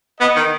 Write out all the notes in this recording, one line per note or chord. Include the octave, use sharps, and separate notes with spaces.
B3 D#5
D#3